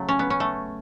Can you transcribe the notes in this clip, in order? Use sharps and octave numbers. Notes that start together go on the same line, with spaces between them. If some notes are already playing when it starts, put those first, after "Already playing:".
Already playing: C#3 F#3 A3
C#4
B3
C#4
A3